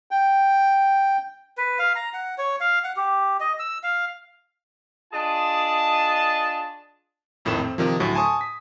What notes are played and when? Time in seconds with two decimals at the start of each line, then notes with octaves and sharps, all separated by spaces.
0.11 G5
1.58 B4
1.79 F5
1.96 A#5
2.13 F#5
2.38 C#5
2.60 F5
2.84 F#5
2.96 G4
3.40 D#5
3.59 E6
3.83 F5
5.13 D4 F4 G#4 D#5 A5
7.45 A#1 F2 A2 D#3 E7
7.58 C4
7.78 C3 D#3 F3
8.00 D2 A2 F#3
8.15 G#5 A5 C6 C#6 D#6
8.41 B6